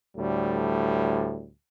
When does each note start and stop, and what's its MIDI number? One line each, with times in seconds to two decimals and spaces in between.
0.17 1.51 38
0.17 1.51 45
0.17 1.51 55